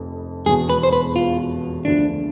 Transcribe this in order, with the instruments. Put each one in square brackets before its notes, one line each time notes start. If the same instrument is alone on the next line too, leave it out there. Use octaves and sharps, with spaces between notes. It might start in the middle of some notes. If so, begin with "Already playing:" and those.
Already playing: [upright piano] F1 F2
[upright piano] E1 E2 B2 [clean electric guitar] G#4
[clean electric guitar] B4
C5
B4
F4
[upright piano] D2 D3 F3 [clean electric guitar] D4